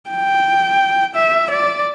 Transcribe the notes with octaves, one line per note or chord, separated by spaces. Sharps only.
G5
E5
D5